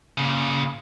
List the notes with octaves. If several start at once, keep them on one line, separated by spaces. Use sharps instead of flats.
A#2 C#3